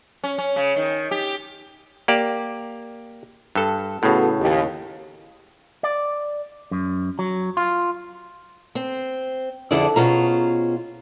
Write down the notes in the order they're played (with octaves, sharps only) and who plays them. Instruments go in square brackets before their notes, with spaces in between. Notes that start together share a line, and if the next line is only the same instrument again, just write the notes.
[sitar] C#4
C#4
C#3
D#3
G4
[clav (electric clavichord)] A#3 G4 D5
G2 A4
[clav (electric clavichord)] A2 C#3 [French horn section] B3 F#4 A4
[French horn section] D#2
[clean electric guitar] D5
F#2
F#3
F4
[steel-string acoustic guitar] C4
F2 D3 E4 G#4 D5
B2 C#4 F4 G#4 C5 A#5